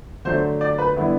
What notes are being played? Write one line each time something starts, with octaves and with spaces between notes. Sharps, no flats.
D3 F#3 A3 C5
D5
B4
D3 G3 B3 E4